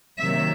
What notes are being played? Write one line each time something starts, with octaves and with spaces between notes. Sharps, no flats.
C3 D#3 F#3 A#3 E5